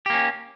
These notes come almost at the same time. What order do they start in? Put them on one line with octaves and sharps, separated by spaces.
G4 A#3 C#4